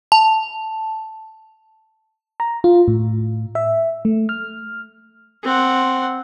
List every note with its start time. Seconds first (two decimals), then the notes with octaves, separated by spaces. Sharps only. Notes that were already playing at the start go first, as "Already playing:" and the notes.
0.12 A5
2.40 A#5
2.64 F4
2.88 A2
3.55 E5
4.05 A3
4.29 F6
5.43 C4 F#5